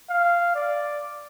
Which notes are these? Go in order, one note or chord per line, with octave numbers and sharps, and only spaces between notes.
F5
D5